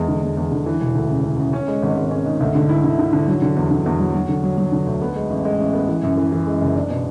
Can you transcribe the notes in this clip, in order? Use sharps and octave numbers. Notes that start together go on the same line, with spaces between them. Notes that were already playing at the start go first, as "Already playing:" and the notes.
Already playing: E2 G#3
D3
E2
E2
D3
E3
E1
D2
C#3
C#3
C#3
C#4
G#3
G#1
G#1
C#4
G#2
D2
D3
E4
D3
D3
D3
F#3
D3
E2
D3
E2
F#3
F#3
D3
F#3
F#3
D3
D2
B3
G#3
A1
G#3
A1
B3
E3
F#2
E3
E3
G#3
F#1
D4
B2